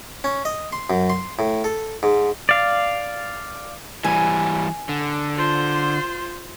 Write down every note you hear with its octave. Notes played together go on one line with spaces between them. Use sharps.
C#4
D#5
C6
F#2
C6
A2
A4
G#2
D5 F5
E3 G3 G#5
D3
F4 C5